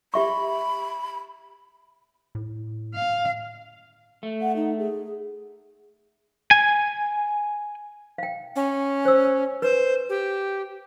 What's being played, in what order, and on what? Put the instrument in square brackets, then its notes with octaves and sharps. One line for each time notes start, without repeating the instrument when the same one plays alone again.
[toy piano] G4 E5 C#6 [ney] B5
[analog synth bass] A2
[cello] F5
[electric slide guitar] A3
[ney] F#5
D#4
G#4
[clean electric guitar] G#5
[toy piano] F5 G5
[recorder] C#4
[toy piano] C5 E6
[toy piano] B4 [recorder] C5
[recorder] G4